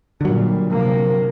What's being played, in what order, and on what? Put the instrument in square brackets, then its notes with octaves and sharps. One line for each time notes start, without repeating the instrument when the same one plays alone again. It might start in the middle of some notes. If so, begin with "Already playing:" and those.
[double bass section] A#2 G3 [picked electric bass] D3 F#3
[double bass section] C3 F3 A#3